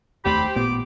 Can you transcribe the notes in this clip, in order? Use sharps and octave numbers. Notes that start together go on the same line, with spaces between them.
F1 D#2 A3 C4 G4 B5
A1 A#2 B3 D6